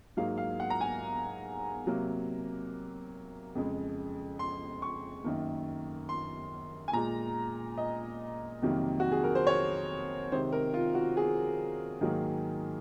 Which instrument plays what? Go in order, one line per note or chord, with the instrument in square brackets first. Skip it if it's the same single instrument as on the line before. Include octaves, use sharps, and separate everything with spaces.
[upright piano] G#2 F#3 A#3 F5
F5
F#5
A#5
G#5
C3 F#3 A#3
F2 C#3 G#3
C6
C#6
F#2 D#3 A#3
C6
G#5
A#2 G#3 A#5
D#5
F2 C3 D#3 F#3 A#3
F#4
G#4
A#4
C5
C#5
C3 D#3 G#3 C5
A#4
F4
F#4
G#4
G#2 D#3 F#3 A#3